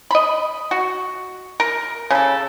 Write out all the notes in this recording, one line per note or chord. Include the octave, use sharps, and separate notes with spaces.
D#5 B5
F#4
A#4
C#3 A4